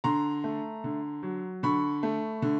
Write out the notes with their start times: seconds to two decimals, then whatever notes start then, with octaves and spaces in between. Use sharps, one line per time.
0.04 D3 A#5 C6
0.44 A3
0.84 D3
1.23 F#3
1.63 D3 B5 C#6
2.03 A3
2.42 D3